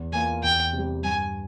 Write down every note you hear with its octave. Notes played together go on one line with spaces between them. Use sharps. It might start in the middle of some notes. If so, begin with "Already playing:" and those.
Already playing: E2
E3 A#3 F4 G#5
E2 G5
C3
G3
G2 G#5